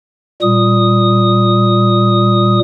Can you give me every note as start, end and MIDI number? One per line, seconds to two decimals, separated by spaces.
0.42 2.60 46
0.42 2.60 55
0.42 2.60 87